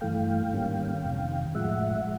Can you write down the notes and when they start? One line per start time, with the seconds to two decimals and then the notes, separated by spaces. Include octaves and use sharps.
0.01 G2 E3 A3 F5 G5
0.53 G#2 D#3 G3 A#3 C#4
1.04 F2 C3 D#3
1.55 A2 F3 G#3 E5 F#5